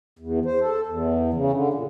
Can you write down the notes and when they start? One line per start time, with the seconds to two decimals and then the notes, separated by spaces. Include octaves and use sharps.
0.19 E2
0.46 C5
0.61 A4
0.87 E2
1.34 C#3
1.52 D3
1.73 A#2